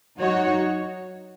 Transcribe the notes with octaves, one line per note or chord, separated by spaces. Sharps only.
F#3 D#4 F#4 C#5